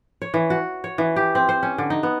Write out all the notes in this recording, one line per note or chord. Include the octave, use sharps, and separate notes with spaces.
C#5
E3
F#4
C#5
E3
G4
C4
C5
C#4
D3
D#4
B3